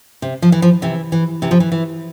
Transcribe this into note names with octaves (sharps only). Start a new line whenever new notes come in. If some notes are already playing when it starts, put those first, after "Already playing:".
C3
F3
E3
F3
C3 E3
E3
C3 E3
F3
E3
E3